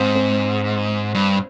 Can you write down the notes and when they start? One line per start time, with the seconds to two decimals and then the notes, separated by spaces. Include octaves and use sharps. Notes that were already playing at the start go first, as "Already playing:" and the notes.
Already playing: G#2 C4
0.15 C4
1.15 G2